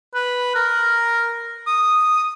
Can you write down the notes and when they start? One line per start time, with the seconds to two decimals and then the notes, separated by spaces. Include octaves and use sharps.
0.15 B4
0.55 A#4
1.67 D#6